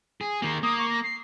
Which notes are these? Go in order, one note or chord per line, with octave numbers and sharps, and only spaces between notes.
G#4
D#3 A#3
A#3 D#6
C#6
A#6
C7